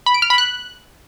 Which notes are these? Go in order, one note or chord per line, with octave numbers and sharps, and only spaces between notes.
B5
D7
F6
B5
F#6